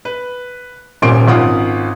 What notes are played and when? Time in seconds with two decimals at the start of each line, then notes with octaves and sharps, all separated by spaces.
0.05 B4
1.02 D#1 A#2 C#4 C6 D7
1.27 G#1 C#4 F4 F#5 D#6